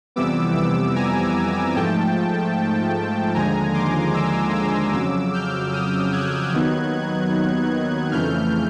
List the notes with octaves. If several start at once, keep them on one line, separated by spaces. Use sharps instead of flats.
F2 C3 E3 G3 B3 D6 E6
D6 E6
G#5 A#5
G#2 F3 A3 G5 A5
D#2 D3 F3 G#3 G#5 A#5
C6 D6
D6 E6
D6 E6
F2 C#3 F#3 D6 E6
F6 G6
D#6 F6
F#6 G#6
D#2 D#3 F#3 B3 D#4
F2 C#3 E3 A3 F6 G6